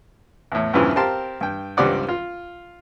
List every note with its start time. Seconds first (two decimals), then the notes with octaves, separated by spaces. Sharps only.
0.52 E2 A2
0.73 E2 G2 A#2 C#3 E3 F3
0.96 C4 G4 A#4 F5 A5 C6
1.41 G2 G5
1.77 C#2 G2 G3 C4 D5 F#5
2.08 F4